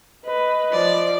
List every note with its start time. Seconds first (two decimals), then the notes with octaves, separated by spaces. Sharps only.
0.25 B4 D#5
0.72 F3 D5